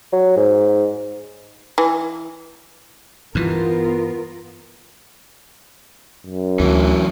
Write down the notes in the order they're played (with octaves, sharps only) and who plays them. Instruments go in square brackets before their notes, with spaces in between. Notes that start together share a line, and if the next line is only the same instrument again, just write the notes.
[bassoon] F#3
G#2
[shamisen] E3
[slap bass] G2 E3 [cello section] B3 F4 A#4
[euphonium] F#2
[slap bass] D2 [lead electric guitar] E3 F#3